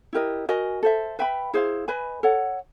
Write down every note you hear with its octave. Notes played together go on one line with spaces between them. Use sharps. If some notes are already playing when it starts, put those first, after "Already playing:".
E4 G4 A#4 D#5
F#4 A#4 D#5 G#5
A4 C5 E5
B4 E5 G5 B5
E4 G#4 C5 F5
B4 D#5 G#5 B5
A4 C#5 F#5